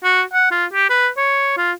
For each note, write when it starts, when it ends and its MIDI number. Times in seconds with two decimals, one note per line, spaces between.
0.04 0.22 66
0.33 0.50 78
0.51 0.65 65
0.73 0.89 67
0.90 1.08 71
1.17 1.54 73
1.57 1.72 65